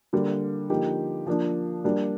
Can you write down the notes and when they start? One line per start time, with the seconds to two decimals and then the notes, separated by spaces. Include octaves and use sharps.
0.13 D3 G3 A#3
0.70 D3 F3 A#3 D#4 G4
1.27 F3 A#3 D4
1.84 G3 A#3 D4